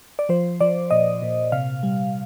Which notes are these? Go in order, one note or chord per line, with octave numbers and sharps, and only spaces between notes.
D5
F3 C5
F3 D5
A#2 D#5
A#2
C3 F5
G3